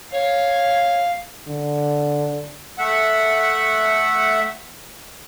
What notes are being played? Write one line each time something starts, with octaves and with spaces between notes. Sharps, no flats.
C#5 F5
D3
A3 E5 F#5